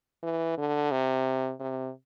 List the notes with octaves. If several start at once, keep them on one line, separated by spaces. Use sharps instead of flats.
E3
D3
C3
C3